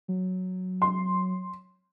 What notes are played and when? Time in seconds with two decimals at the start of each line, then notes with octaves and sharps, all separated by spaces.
0.08 F#3
0.82 C6